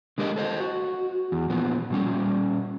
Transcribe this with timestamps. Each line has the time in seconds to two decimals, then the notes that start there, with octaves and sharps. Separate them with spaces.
0.18 D3 G#3 G4 A#4 D5 D#5
0.36 A4 C5 D#5
0.60 F#4
1.32 E2
1.50 A#2 F3 B3
1.90 A#2 G3 C#4